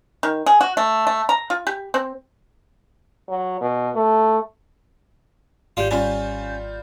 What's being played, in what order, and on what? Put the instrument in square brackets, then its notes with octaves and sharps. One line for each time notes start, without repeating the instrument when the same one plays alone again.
[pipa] D#3
G#4
F#4
A3
A3
A#5
F4
G4
C4
[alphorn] F#3
B2
A3
[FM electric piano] G#1 G6 [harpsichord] G3 F4
[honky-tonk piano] G3 F4 [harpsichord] C#4